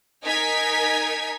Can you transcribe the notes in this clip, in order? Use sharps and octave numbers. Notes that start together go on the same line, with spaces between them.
D#4 A#4 G#5 G#6 B6